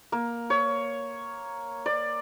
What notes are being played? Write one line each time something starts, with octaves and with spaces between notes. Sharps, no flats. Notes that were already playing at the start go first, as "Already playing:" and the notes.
A#3
C#5
D5